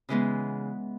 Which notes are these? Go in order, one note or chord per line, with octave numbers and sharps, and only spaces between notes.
C#3 E3 G#3 B3